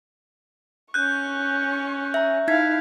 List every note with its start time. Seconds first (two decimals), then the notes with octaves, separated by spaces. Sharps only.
0.94 C#4 C#6 F#6 G6
2.14 E5 A#5
2.48 D#4 E4 F5 G#6 B6